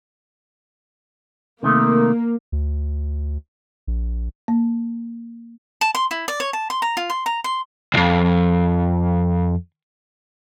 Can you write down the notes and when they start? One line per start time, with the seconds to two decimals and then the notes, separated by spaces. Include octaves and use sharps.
1.63 C3 D#3 A3 A#3
2.52 D2
3.87 A#1
4.48 A#3
5.81 A5
5.95 C6
6.11 E4
6.28 D5
6.40 C#5
6.53 A5
6.70 C6
6.82 A#5
6.97 F4
7.10 C6
7.26 A#5
7.44 C6
7.94 C2 F2